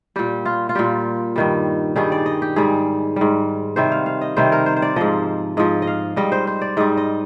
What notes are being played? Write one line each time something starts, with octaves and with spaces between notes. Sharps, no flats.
A#2 G3 G4
F4
F4
A#2 G3 G4
G2 D#3 G3
G2 D#3 G3 G#4
D5
D#5
G4
G#2 G3 G#4
G#2 G3
C3 D#3 G3 C5
F5
F5
D#5
C3 D#3 G3 C5
A#4
C5
C5
D5
G#2 F3 D#5
G#2 F3 D#5
D#5
F5
G#2 G3 D#5
C5
C5
D5
G#2 G3 D#5
D#5